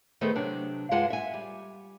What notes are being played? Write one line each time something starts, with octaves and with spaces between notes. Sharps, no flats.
D#3 A3 B3 G#4 A4 C5
C3 F#3 D4
G2 G#3 F4 F5 F#5 A5
E5 G#5
G3